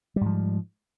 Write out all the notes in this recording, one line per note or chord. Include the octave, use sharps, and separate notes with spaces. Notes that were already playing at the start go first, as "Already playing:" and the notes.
G#2 F3 G3